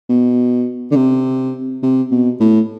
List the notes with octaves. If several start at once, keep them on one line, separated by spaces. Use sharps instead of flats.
B2
D3
C3
C3
B2
A2